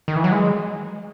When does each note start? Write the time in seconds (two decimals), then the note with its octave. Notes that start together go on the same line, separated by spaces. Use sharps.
0.08 D#3
0.16 E3
0.24 F#3
0.32 G#3